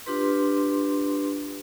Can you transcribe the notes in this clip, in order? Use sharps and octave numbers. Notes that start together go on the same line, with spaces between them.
D4 F4 G4 B4 C6